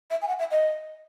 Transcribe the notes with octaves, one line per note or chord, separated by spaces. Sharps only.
E5
G#5
F#5
E5
D#5